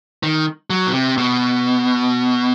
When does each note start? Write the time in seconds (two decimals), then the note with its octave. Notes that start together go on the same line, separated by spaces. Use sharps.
0.23 D#3
0.70 F#3
0.87 B2
0.93 C3
1.18 B2